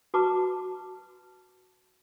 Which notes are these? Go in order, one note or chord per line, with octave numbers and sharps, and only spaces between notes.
F#4 B4 A5 A#5 C#6 D6